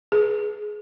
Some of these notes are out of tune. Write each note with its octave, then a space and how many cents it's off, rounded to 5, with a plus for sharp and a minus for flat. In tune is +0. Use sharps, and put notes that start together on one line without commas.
G#4 +15 B4 -10